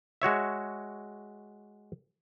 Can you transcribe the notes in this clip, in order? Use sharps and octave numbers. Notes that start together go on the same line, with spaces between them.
G#3 F#4 C#5 E5